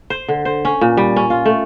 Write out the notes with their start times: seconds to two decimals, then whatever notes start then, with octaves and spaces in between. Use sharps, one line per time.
0.10 C5
0.28 D3
0.45 C5
0.65 C#4
0.81 A#2
0.97 G3
1.16 C#4
1.30 F4
1.46 A3